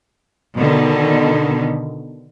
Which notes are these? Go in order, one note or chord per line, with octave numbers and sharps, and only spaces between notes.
B2 D3 D#3